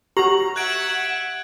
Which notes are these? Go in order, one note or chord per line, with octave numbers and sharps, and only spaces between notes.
F#4 G4 A#5 F#7
E5 F#5 F#6 G#6 D7